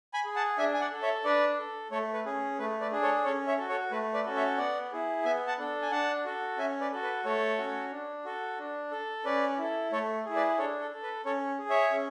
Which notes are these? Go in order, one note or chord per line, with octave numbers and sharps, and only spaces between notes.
G#5 B5
G#4
F#5 A5
D4 E5 G#5
G#5
D5 F#5
A4
C#5 E5
D4 B4 D5
A4
A3 A4 C#5
B4
C#4 G#4
A3 B4
B4 D5
D4 G#4
A4 C#5
C#4 A4 C#5
C#5 E5
F#4 A4
A4 C#5
A3 B4
B4 D5
C#4 F#4 A4
C#5 E5
B3 D5 F#5
E4 G#4
B3 E5 G#5
F#5 A5
D4 A4
G#5
D4 F#5 A5
F#4 A4
C#4 E5 G#5
B4 D5
F#4 A4
B4
A3 A4 C#5
C#4 F#4
D4
F#4 A4
D4
A4
C#4 B4 D5
E4 A4
A3 A4 C#5
E4 G#4
B4 D5
D4 A4 C#5
A4
A4
B4
C#4 A4 C#5
G#4
C#5 E5
C#4